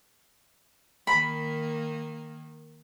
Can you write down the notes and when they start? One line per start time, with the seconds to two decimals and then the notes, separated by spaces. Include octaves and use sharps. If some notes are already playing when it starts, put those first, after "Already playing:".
1.07 D#3 A#3 B5